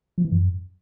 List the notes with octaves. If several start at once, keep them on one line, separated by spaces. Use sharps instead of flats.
F3
E3
F#2